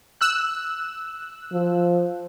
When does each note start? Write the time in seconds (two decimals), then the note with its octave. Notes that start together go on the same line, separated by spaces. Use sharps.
0.21 E6 F#6
1.53 F3